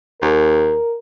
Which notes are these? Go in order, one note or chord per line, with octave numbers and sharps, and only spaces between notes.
D#2 A#4